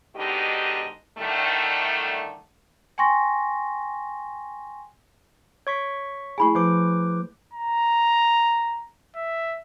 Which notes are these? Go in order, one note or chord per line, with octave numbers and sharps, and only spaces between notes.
G#2 B2 D3 D#4 G4 D#5
A2 D3 D#3 G3 A3
G5 G#5 C6 C#6 A#6
C#5 C#6 B6
A3 E4 G#4 G#5 B5 C#6
F3 B4 C5 D6
A#5
E5